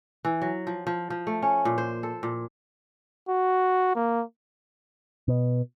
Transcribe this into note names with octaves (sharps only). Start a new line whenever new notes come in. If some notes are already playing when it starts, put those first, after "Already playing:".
E3
F#3
F3
F3
F3
A3
C#4
A#2
C5
A4
A#2
F#4
A#3
B2